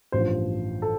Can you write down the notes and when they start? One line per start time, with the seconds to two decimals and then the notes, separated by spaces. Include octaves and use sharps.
0.12 A1 G2 F3 C5
0.82 A4